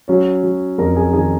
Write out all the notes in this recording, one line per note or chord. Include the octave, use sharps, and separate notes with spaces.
F#3 C#4 C#5
F#3
F2 A#4 A#5
G#4 G#5
D#3 G#4 G#5